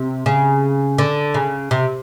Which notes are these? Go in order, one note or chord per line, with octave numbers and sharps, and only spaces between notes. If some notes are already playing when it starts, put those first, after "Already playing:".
Already playing: C3
C#3
D3
C#3
C3